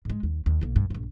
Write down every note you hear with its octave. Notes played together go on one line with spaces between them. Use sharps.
G#2 G#3
D#2
D#2
B1 A#3
G2
A#1 G2